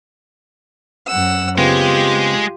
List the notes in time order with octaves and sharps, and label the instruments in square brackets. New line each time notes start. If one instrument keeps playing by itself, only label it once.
[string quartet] F#2 F#5 E6
[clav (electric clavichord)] C#3 B3 C4 [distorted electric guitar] G#3 [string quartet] F4 G4